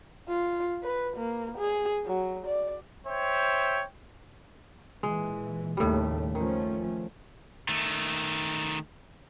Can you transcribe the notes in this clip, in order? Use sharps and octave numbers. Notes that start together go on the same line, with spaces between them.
F4
B4
A#3
G#4
F#3
D5
C5 C#5 E5 G5
A#2 E3 G#3
D#2 A2 C#3 G3 A3
D#3 F3 A3 C#4
D#3 A3